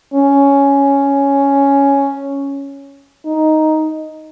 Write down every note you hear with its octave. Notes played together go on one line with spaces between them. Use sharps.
C#4
D#4